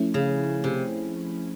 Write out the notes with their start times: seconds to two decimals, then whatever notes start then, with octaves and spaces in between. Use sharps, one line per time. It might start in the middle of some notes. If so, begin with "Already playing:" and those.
Already playing: F3 A3 C#4 E4
0.14 C#3
0.64 C3